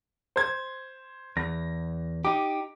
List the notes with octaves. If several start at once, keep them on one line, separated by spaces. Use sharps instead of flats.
C5 G#6
E2 A#6
D#4 G4 D6